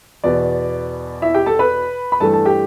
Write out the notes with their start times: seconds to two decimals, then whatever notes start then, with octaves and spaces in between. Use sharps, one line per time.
0.24 E2 B2 B3 D5
1.22 E4 E5
1.34 G4 G5
1.46 A4 A5
1.59 B4 B5
2.12 B5
2.20 G2 E3 A3 A4 A5
2.33 A5
2.45 G4 G5